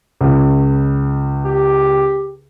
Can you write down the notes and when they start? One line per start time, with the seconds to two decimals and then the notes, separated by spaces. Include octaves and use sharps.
0.21 C#2
1.45 G4